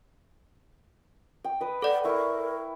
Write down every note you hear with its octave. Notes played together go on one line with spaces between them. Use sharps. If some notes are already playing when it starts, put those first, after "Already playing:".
G5
B4 D#5
A4 D5 F#5
E4 A#4 C#6